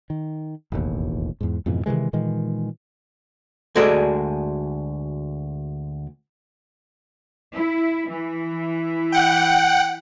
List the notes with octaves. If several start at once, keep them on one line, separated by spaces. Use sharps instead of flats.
D#3
E1 A1 D#2
E2 G#2
F2 G#2 B2 E3
C3 D#3 E3 G#3
A#2 D#3 E3 G#3
D2 G#3 F#4 G#4 A4 D5
E4
E3
F#5 G5